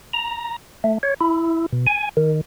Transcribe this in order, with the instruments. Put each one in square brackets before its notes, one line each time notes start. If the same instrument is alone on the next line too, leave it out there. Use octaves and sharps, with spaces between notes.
[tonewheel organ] A#5
A3
C#5
E4
B2
G#5
D#3